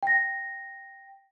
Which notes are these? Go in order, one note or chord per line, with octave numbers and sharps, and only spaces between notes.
G5 A#6